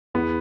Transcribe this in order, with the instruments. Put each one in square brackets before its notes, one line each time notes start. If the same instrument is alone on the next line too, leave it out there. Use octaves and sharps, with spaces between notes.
[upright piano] E2 E3 [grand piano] B3